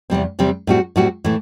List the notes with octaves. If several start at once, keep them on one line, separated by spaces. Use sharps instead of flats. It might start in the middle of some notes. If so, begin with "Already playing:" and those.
E2 C3 G3 C4
E2 C3 G3 C4
A2 G3 C4 F#4
A2 G3 C4 F#4
A2 E3 A3